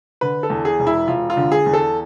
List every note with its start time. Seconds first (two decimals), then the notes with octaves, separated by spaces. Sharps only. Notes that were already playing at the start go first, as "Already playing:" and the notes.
0.21 D3 B4
0.43 A4
0.50 E2
0.65 G#4
0.80 E1
0.87 E4
1.08 E1 F4
1.30 F4
1.37 D3
1.52 G#4
1.66 E2
1.73 A4